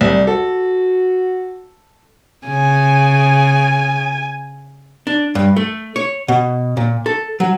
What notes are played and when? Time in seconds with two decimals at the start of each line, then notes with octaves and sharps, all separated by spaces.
0.01 C2 G3
0.27 F#4 A4
2.47 C#3 G#5
5.07 D4
5.35 G2
5.56 A3
5.96 C#5
6.28 B2
6.77 A#2
7.06 A4
7.40 F#3